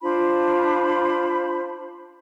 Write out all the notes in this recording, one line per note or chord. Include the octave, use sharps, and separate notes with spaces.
D4 F4 C5 B5